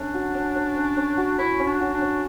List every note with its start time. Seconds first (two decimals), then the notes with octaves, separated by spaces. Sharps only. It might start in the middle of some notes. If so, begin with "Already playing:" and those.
Already playing: A3 C#4 D4
0.14 F#4
0.34 C#4
0.55 C#5
0.76 C#4
0.97 C#4
1.17 F#4
1.38 E4 C#5
1.59 C#4
1.66 D4
1.81 F#4
1.94 D4
2.01 C#4